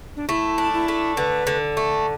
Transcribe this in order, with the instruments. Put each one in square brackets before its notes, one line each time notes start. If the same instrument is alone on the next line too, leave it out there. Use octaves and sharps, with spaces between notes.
[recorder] D4
[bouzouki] A3 [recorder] E4
[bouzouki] D4
[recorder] E4
[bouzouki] A3
[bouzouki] D3 [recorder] B4
[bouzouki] D3
A3